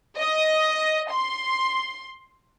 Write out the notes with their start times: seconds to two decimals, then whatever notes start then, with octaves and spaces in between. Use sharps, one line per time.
0.19 D#5
1.12 C6